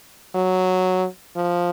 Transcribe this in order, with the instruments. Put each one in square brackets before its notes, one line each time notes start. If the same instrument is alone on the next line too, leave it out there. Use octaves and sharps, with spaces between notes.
[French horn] F#3
F3